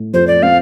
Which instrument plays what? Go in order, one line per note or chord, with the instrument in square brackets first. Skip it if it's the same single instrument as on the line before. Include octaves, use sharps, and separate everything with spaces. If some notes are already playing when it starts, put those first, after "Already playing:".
Already playing: [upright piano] A2
[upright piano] F2 [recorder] C5
[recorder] D5
[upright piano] C4 [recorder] F5